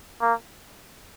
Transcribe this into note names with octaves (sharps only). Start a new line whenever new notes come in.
A#3